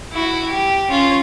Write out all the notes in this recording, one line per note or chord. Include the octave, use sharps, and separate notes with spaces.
E4 F#4
G4
C#4 F4